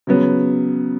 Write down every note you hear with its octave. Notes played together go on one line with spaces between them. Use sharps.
C#3 F#3 B3